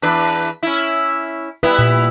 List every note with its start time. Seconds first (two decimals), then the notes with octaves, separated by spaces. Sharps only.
0.02 E2 D4 B4
0.63 C#4 E4
1.63 G3 B3 E4 B4
1.79 A#2